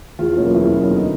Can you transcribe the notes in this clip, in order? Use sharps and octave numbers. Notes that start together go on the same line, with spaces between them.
E2 F4
B2 F#3 A#3 C#4
E2 E4
B2 F#3 A#3 C#4
D2 D#4